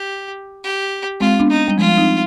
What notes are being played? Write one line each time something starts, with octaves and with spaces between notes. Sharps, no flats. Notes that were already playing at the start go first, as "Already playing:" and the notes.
Already playing: G4
G4
G#3 C4 F4
B3 D4
D#4
G3
F3 G#3 F4
C4 D#4